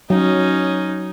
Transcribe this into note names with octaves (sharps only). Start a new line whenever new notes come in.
F#3 C#4 D#4